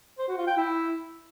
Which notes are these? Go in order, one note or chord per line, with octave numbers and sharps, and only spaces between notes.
C5
F#4
F4
G5
E4